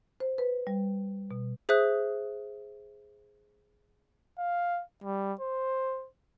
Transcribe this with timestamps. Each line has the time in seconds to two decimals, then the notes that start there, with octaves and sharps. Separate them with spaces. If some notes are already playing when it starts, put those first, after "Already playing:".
0.20 C5
0.38 B4
0.67 G3
1.31 B2
1.69 G#4 C5 E5 D#6 F#6
4.39 F5
5.03 G3
5.41 C5